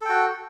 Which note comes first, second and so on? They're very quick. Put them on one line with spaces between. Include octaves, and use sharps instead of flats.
A4 G5 F#4